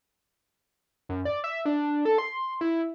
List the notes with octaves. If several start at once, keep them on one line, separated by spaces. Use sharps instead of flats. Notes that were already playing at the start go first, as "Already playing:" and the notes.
F#2
D5
E5
D4
A4
C6
E4